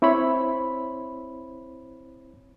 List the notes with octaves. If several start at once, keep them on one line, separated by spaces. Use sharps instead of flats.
C4 E4 C5 C#5 B5